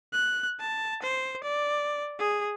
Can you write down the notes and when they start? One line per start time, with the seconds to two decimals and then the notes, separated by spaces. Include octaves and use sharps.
0.13 F#6
0.60 A5
1.03 C5
1.44 D5
2.19 G#4